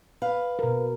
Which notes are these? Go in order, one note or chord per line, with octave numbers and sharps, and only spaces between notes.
B4 F5
B2 A#4